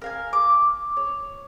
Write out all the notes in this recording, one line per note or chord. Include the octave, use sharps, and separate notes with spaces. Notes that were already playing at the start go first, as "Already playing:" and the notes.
A#4 F5 G#5
D6
C#5